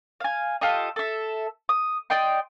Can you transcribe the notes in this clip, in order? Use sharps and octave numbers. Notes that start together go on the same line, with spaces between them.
F5 G#5
F4 G4 A4 D#5
A4 E5
D#6
D5 D#5 G5 C6